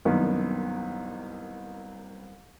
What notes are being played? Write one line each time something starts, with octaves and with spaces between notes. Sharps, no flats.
C2 F#2 D#3 A#3 B3